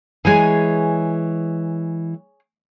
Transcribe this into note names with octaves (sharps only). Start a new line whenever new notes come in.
E3 G#3 G#4 C#5 G#5